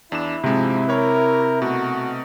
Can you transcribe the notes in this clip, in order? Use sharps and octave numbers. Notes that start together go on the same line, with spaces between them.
E2 D4 E4 E7
G#2 C3 F3 G#3
G4 A#4 C#5
B2 A3 F#4